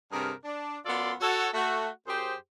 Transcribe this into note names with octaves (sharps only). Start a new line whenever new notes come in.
G2 C3 G#4 A#4
D4
F#2 B3 F4 A4 D5 C6
F#4 A4 C#5
A3 F#4
F#2 G4 G#4 C5